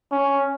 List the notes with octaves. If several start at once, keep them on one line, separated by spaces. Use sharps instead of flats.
C#4